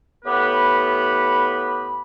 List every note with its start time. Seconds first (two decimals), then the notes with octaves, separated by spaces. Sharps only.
0.25 A2 B3 G4 B4 B5